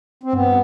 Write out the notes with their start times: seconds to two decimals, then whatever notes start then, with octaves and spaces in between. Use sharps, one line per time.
0.23 C4
0.33 G2 B3